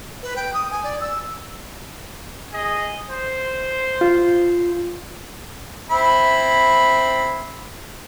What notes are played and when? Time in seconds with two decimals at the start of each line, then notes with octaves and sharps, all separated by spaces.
0.23 B4
0.36 G5
0.54 D#6
0.71 G#5
0.84 D5
1.01 E6
2.53 G#4 D#5
3.10 C5
4.01 F4
5.90 C4 E4 B5